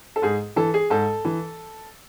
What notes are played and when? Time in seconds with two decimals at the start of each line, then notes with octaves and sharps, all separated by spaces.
0.16 A4
0.22 G#2 G#4
0.56 E3 A4
0.74 G#4
0.90 G#2 A4
1.25 E3